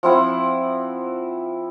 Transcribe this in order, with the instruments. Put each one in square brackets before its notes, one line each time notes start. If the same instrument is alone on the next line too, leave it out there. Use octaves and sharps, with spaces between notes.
[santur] F3 C4 E4 F#5